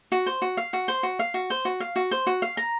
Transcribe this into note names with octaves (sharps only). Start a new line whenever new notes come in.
F#4
C5
F#4
F5
F#4
C5
F#4
F5
F#4
C5
F#4
F5
F#4
C5
F#4
F5
A#5